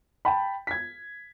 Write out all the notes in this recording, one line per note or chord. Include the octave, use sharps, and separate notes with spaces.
G5 A5 B5
G#6 B6